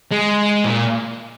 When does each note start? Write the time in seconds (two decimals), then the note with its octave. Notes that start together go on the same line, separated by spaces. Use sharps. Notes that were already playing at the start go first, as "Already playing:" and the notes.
0.11 G#3
0.65 A#2